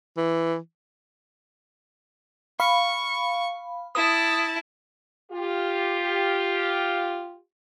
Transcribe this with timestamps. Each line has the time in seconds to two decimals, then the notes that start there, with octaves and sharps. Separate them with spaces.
0.17 E3
2.60 F5 B5 C#6
3.95 E4 A5 D#6
5.32 F4 G4